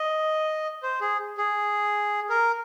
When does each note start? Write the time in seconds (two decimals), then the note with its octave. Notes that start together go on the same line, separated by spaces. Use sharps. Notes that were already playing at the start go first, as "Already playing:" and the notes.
Already playing: D#5
0.83 C5
1.01 G#4
1.37 G#4
2.30 A#4